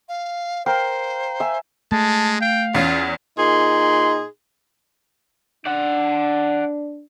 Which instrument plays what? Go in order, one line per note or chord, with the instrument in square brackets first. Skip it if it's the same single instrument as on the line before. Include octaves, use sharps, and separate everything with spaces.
[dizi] F5
[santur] A#4 F5 G5 [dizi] C5
[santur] E5 G#5
[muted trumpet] G#3 [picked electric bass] A3 [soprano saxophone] A5
[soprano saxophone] F5 [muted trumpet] G5
[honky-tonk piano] E2 C#4 [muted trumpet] F4
[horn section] A#2 D#4 G#4 C6
[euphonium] D4 [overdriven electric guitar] D5 F#5